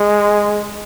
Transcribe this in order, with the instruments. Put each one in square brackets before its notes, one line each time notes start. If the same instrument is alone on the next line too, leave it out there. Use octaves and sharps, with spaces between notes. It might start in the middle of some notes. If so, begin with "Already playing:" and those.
Already playing: [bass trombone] G#3